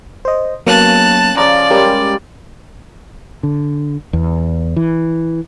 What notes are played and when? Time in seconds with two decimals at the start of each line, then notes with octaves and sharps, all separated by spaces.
0.25 C5 D#5
0.67 C#3 F#3 A#3 B3 A5 F#6
1.37 C#3 F3 D5 A#5
1.70 G3 G#3 C#4 G4 A#4
3.43 D3
4.13 E2
4.76 E3